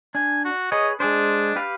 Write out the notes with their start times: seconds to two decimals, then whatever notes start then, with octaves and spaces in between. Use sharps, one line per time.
0.15 D4 G#5
0.45 F#4
0.72 G#4 B4 C#5 D#5
1.00 G#3 D4 G#4 C5
1.56 G4 B4 F5